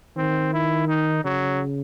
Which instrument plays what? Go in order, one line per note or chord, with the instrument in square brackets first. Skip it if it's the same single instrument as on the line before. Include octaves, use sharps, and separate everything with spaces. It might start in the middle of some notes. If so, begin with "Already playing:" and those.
[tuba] D#3 [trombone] C4
[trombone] E4
D#4
[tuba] C#3 [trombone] F#3